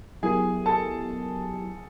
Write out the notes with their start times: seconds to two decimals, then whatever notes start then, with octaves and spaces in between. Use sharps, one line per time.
0.23 F#3 B3 E4 G4 G#4 A#4 G#5
0.66 A4 A5